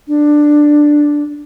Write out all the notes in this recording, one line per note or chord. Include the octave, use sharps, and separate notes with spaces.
D4